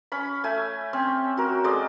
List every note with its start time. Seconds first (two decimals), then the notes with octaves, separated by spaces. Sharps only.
0.12 C#4 B5
0.44 A3 G#5
0.93 C4 C#4
1.37 F#4 A#4
1.64 G#3 A4 D5 D#5